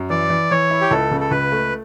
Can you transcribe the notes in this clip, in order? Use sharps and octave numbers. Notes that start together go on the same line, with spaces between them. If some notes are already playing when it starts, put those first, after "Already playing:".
Already playing: F#2
E3 D5
E3
E3 C#5
E4
G4
C#2 A4
C#3
A4
C#2 B4
A3